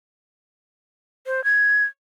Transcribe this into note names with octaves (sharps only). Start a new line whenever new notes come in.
C5
G#6